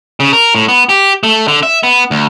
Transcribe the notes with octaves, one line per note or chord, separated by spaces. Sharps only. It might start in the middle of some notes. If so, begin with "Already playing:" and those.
C#3
A#4
A2
B3
G4
A3
D3
E5
B3
D2